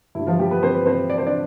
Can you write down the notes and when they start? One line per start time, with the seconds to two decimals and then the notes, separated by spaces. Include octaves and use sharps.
0.15 G2 D3 G3 E4
0.26 F3 F4
0.39 G3 G4
0.51 B3 B4
0.63 C4 C5
0.75 B4
0.86 C4 C5
1.10 D5
1.18 C5
1.26 D4 D5